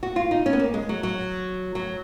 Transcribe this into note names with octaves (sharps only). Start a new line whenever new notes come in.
F#4
F4
D#4
C#4
B3
A#3
G#3
F#3
F#3
F#3